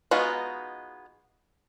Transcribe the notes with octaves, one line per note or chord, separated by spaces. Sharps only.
G#3 B3 D#4 F4 F#4